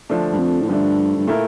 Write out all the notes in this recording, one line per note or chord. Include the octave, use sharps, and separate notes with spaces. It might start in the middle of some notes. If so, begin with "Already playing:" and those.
D3 F3 A3 D4
G2
F2
A2
G2 D3 F3 A3 D4
G2
A#2 A3 E4 A#4